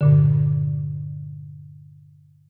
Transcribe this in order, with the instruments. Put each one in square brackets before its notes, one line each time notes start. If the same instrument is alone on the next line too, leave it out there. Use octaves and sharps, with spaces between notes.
[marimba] G2 A#2 D3